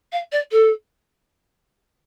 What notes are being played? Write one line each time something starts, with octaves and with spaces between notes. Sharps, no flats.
F5
D5
A4